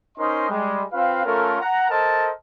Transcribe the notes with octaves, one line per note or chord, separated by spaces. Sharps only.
C#4 D#4 A#4 C5 D#5 C6
G3 G#3
C4 F4 B4 F5
A3 C#4 F4 A4 A#4
F#5 A#5
A4 A#4 C5 D#5 A5